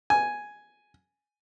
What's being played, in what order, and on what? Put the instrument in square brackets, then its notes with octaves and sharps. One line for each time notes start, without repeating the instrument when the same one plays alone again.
[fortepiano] G#5